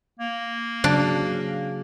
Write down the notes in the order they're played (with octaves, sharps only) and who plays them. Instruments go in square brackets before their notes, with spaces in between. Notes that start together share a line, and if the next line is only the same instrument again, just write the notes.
[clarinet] A#3
[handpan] C#3 F#3 F5 [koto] D4